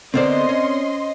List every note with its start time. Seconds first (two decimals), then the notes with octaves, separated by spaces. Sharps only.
0.14 D3 B3 C4 A#4 C5 D5 D#5 C6
0.49 C#4